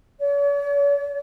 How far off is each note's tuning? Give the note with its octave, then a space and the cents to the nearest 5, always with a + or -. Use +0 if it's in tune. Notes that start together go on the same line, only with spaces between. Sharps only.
C#5 +45